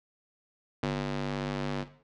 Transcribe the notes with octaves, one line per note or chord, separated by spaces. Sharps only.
G1